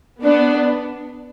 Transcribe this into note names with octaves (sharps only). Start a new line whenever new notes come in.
B3 D4